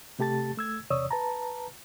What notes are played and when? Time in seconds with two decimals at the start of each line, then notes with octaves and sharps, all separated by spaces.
0.19 C3 A3 G4 A5 A6
0.57 A3 E6 G#6
0.90 E2 C3 C#5 D5 D#6 E6
1.11 B4 A5 A#5